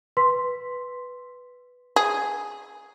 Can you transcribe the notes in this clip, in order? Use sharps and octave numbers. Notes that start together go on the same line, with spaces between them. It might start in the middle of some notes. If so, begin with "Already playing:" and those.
B4 C6 B6
G#4